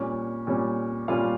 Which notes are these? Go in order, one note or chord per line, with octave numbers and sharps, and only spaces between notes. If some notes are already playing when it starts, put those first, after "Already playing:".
Already playing: A#2 G3 C#4
A#2 G3 C#4
A#2 G3 C#4 F4 F5